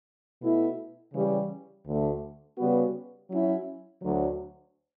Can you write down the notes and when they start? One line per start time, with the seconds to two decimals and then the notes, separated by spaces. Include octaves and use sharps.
0.42 B2 A3 E4
1.14 C#3 E3 G3 C#4 G4
1.86 D2 D3 A3
2.57 C#3 G3 B3 F#4 B4
3.30 F#3 C#4 E4
4.02 D2 D3 F#3